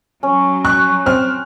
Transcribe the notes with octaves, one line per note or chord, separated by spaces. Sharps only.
F#3 C#4
C#6 F#6
C4 F6